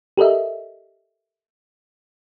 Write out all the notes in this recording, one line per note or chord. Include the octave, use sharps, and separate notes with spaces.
G4 A4 A#4 D#5 E5